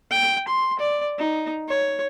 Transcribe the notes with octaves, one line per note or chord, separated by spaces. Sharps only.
G5
C6
D5
D#4
C#5